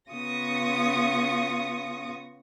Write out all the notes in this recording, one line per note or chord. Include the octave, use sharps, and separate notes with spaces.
C#3 B3 F4 C#6 D#6 A#6